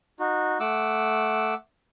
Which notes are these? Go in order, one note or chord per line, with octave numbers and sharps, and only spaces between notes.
D#4 F#4
A3 F#5 D6 E6